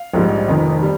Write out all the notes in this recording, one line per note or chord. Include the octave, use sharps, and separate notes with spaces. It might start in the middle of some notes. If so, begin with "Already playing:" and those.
Already playing: F5
A#1 G#2 G3
F1 F2 D#3
G3